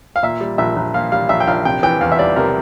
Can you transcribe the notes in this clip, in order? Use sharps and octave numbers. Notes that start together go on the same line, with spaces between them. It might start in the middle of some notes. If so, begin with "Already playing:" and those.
F5
A#2 E5
G3
A#1 E5
A#1
A#2 F5
G3 F5
A#1 E5
G5
A#1 F5
C3 G5
E3 G5
E2 F5
E5
G3 D5
C3 A#4